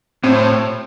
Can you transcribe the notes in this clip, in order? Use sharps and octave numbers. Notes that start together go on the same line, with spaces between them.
A2 C4